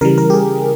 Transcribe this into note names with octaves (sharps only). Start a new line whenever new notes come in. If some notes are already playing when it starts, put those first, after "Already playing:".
C#3 E3 G3 A#4
A#4
G4
G#4